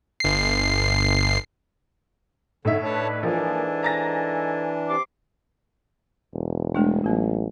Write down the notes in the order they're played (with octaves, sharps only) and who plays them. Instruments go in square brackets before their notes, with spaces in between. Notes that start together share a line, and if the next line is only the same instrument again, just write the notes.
[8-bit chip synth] G1 C7
[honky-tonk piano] A2 D#4 E5 [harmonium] D3
[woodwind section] D4 B4 [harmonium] C#5 A5
[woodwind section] G#2 A4 G#5 [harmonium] E3 D4 [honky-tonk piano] F3 A#3
[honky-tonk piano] A#5 A6 A#6
[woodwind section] C3 C6 D6
[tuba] E1
[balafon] G#3 A3 D4
[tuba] A1 [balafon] F#3 B3 F4